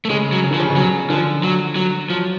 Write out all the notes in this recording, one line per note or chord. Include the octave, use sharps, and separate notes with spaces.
A3
C#3 G#3
F#3
C#3
D3 F3
C#3
B2
C#3 F#3
D3 F3
F#3
F#3
F3 F#3